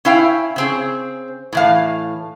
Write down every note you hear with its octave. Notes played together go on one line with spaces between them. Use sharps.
C#4 E4 F5 G5
C#3 C4 G#4
A2 E3 F5